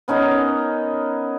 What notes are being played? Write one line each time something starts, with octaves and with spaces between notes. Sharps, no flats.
B3 C#4 D#4 A#4